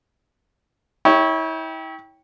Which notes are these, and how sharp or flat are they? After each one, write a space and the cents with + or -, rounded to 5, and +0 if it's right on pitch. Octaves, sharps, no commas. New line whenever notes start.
E4 -35 C#5 +0 G5 +0